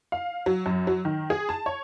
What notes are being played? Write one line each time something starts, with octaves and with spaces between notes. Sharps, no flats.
F5
F#3
F#2
F#3
D#3
G#4
A5
C#5